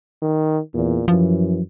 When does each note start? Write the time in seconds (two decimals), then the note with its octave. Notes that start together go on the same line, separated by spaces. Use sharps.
0.22 D#3
0.74 E2 A#2
1.08 F#2 E3 F3